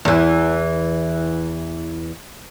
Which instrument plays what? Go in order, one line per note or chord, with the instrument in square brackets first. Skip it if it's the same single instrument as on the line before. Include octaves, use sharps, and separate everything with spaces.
[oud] E2 E3